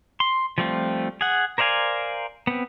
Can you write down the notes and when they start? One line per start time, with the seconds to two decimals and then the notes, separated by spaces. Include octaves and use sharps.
0.20 C6
0.58 F3 G3 A3 C4 F4
1.21 G#4 F#5
1.58 A#4 C5 D5 F5 G#5
2.47 B3 C4